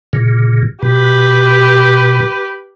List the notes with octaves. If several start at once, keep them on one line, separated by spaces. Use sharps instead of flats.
A#2 C#3
B2 G4 B4